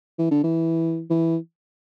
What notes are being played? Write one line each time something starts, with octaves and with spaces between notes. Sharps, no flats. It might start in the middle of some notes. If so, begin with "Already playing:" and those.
E3
D3
E3
E3